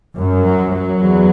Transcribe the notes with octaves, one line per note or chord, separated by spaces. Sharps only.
F#2
F#3
F#3
E2